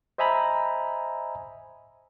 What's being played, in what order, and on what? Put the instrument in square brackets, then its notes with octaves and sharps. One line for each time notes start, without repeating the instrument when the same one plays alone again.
[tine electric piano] C5 D#5 E5 G#5 A#5 B5